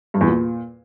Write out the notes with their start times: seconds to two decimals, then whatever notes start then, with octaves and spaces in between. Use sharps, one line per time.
0.14 G2
0.21 E2
0.27 A#2